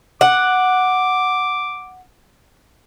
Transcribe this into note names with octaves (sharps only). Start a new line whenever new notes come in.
F#5 D6